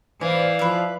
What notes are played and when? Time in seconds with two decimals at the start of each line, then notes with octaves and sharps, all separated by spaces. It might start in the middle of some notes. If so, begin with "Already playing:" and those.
0.21 E3 C5 D5 F5
0.59 F3 B4 E5